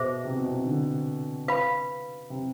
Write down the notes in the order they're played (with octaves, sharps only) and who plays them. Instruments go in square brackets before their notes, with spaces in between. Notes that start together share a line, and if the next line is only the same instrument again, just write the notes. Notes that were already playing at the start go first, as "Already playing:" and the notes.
Already playing: [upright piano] B2 [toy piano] G#4 C5 E5
[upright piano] C3
B2
C3
D3
[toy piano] B4 F5 B5
[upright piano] C3